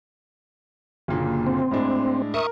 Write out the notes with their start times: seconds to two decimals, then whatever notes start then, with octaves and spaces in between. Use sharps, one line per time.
1.08 F#1 A#2 D3
1.47 C4
1.71 A2 G#3 D4
2.34 A#4 E5 C#6 D#6